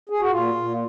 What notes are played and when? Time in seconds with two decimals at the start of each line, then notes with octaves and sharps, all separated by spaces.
0.09 G#4
0.20 F#4
0.31 A#2 F4
0.55 A#2